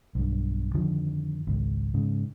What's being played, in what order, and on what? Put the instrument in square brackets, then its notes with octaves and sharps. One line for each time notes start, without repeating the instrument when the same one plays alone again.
[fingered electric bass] B1 G2
F2 D3 D#3 F3
G#1 C#2
G#2 C#3